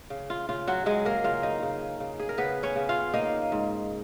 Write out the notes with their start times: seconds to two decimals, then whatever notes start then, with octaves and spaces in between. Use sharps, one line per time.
0.10 C#3
0.30 F4
0.49 C#3 F4
0.68 F#3 F#4
0.86 F#3 G#3 G#4
1.05 A#3 A#4
1.24 C#3 F4 F5
1.43 D#4 D#5
1.62 C#3
2.00 C#3
2.20 G#4
2.29 A#4
2.38 C#3 B3 B4
2.63 C#4 C#5
2.76 C#3
2.89 F4 F5
3.14 A#3 D#4 D#5
3.52 G#2